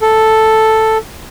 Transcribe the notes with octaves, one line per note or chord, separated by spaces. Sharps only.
A4